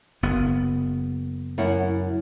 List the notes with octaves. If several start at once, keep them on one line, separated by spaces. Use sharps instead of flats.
F#1 B3
F#2 E4 F#5